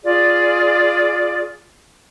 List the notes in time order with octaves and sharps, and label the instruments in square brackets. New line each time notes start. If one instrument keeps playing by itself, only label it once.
[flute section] F4 G#4 D5